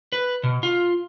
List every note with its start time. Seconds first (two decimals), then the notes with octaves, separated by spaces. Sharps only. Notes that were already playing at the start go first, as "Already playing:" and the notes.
0.12 B4
0.43 B2
0.63 F4